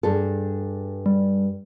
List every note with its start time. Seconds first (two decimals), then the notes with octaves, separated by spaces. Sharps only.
0.03 G2 G#4 A4
1.06 G3